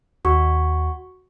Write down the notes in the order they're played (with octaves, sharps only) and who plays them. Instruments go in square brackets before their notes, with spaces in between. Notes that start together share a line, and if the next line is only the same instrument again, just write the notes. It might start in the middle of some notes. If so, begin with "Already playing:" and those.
[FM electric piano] D#2 [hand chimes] F#4 C#6